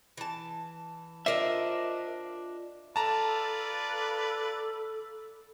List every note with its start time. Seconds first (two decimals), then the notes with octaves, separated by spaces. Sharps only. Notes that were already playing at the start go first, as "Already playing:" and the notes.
0.17 E3 A5
1.26 D4 F4 A#4 C5 D#5 E5
2.96 F4 A4 B4 D5 A5 A#5
3.90 A4